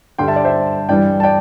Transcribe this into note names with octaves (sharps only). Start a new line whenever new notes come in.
G2 D3 G3 G5 C6
E5 A5
D5
C5 E5
G2 E3 G3 D5 G5
A5
D5 G5